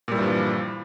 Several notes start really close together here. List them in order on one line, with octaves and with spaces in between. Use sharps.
A#2 G3 E3 G2 F3